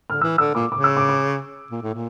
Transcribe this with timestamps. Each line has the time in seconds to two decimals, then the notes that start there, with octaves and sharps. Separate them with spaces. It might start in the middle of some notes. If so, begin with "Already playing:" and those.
0.10 D3 F6
0.21 E3 E6
0.38 D3 E6
0.54 A#2 D6
0.71 C#3 D6
0.84 E6
0.97 D6
1.09 D6
1.71 A#2
1.82 A2
1.94 A#2